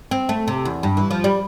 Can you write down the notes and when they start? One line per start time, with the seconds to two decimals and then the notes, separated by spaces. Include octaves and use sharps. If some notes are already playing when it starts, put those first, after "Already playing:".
0.11 C4
0.29 A3
0.48 C3
0.65 E2
0.83 G2
0.97 E3
1.11 F3
1.24 G3